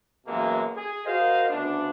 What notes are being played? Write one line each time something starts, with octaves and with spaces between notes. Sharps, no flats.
F#2 B2 E3 G#3 A#3
G#4
F#4 A#4 C5 D#5 F5
D2 C#3 B3 D4